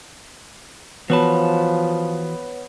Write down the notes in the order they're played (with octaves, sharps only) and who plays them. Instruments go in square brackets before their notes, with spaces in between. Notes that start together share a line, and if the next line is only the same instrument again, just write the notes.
[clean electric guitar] E3 F#4 A5 [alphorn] F3 [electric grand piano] B3 [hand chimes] B4 C#5 B5